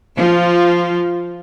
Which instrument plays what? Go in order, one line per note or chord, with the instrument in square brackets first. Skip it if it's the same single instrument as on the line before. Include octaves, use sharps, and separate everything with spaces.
[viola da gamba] F3 F4